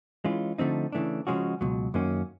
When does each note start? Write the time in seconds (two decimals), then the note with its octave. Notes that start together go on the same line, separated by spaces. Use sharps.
0.25 E3 G#3 C#4 F4
0.58 D3 F3 A3 C4 D#4
0.92 C#3 E3 A3 D4
1.27 C#3 F3 G#3 C#4 F#4
1.61 C#2 B2 F#3
1.94 F#2 D#3 F#3 A#3 C#4